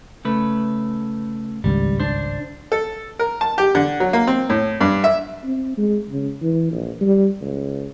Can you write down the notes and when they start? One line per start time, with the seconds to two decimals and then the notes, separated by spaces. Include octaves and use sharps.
0.25 C#3 A3 B4
1.64 G#1 C#2 G2 G3
2.00 D4 C5
2.72 A4
3.19 A#4
3.41 A5
3.58 G4
3.75 D3
4.00 F#3
4.13 A#3
4.27 C4
4.50 A2
4.81 G2
5.04 E5
5.44 C4
5.78 G#3
6.10 C#3
6.42 E3
6.72 A#1
7.01 G3
7.41 C#2